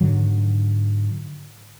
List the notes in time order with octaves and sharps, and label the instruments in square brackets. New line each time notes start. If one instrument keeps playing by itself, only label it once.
[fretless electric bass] G#2 D3 F#3